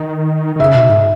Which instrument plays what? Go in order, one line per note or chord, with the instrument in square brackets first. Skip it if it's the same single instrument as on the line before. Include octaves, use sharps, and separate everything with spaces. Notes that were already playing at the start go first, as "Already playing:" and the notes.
Already playing: [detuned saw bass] D#3
D#3
[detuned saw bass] C#3 [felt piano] E5
[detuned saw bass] B2
G#2